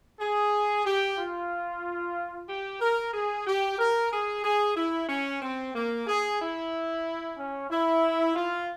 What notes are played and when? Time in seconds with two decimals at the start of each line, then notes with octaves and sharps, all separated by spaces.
0.20 G#4
0.86 G4
1.18 F4
2.48 G4
2.81 A#4
3.13 G#4
3.46 G4
3.79 A#4
4.12 G#4
4.44 G#4
4.76 E4
5.09 C#4
5.42 C4
5.74 A#3
6.07 G#4
6.40 E4
7.37 C#4
7.70 E4
8.35 F4